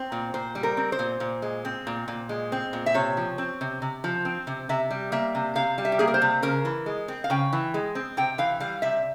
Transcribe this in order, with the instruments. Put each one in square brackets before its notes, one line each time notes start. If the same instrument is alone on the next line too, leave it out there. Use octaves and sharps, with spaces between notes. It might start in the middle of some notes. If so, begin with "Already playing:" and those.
Already playing: [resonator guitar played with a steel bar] C4 C5
A#2
A#2 C5
G3
A#4
C4
C5
A#2
A#2
G#3
C4
A#2
A#2
G#3
C4
A#2
E5
C3 C#5
F3
C4
C3
C3
F3
C4
C3
C3 E5
G3
A#3 E5
C3
C3 F5
G3
E5
G4
A#3 G#4
A#4
C5
C3
C#3 A#4
E3
G#3
C4
F5
C#3 G5
E3
G#3
C4
C3 G5
E3 F5
G3 F5
C3 E5